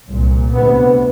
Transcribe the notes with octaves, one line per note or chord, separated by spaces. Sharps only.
C2 A#2
D2 C3 B3